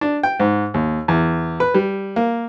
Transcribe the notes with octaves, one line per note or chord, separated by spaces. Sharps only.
D4
G5
G#2
D#2
E2
B4
G3
A#3